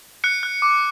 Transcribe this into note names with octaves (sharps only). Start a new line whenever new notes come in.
F#6 C#7
F#6
D6